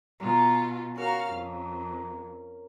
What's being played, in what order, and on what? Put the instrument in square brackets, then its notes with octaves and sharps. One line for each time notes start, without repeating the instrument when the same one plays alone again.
[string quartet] B2 F4 [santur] A#5
[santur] C#4 A#4 [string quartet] F#4 F5 F6
[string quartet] F2